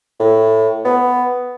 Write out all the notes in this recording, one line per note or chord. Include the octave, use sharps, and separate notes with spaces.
A2
B3